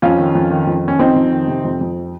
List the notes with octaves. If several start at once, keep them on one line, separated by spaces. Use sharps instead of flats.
F2 C#4 F4
D#3
F2
D#3
F2
D#3
C#4
F2 C4 D#4
F2
D#3
C3
F2
F2